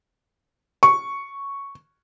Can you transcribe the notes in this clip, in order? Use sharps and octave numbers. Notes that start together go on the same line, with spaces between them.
C#6